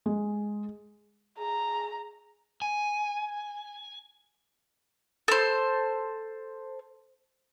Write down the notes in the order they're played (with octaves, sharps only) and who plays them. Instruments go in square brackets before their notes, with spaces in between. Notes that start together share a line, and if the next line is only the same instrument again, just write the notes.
[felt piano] G#3
[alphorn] G#4 [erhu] A#5
[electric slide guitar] G#5
[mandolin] A4 C5